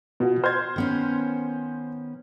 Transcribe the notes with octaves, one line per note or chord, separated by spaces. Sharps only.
B2 B3 F4 F#4
C5 C6 F6 G#6
D#3 B3 C#4